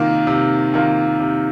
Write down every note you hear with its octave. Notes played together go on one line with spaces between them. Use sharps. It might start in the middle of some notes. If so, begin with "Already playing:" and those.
Already playing: C3 D#3 A#3 F4
C3
D#3 A#3 F4
C3